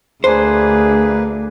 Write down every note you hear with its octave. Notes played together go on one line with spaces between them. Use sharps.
D2 A#3 D4 G#4 B4 C5